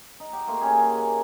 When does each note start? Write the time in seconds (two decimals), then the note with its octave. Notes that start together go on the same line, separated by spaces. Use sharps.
0.20 D#4
0.33 G4 F#5
0.47 A3 A#3 F4
0.61 C#4 G4 G#4
0.78 D#3 G#4
0.98 F#4